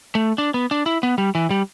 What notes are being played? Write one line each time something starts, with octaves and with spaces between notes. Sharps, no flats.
A3
D4
B3
D4
E4
B3
G3
E3
G3